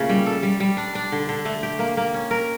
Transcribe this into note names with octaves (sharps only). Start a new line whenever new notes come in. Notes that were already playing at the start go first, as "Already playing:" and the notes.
Already playing: A#2 C#3 A3 A#3 C#4
G3
A4
G3
G3
D4
D4
D3
D3
A3
G4
A#3
A#3
C#4
A#4